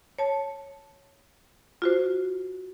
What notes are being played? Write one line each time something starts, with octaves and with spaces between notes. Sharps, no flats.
C#5 A5
F4 F#4 C5